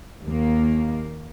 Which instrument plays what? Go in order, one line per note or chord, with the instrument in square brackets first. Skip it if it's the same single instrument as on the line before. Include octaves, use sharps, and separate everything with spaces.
[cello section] D#2 A#3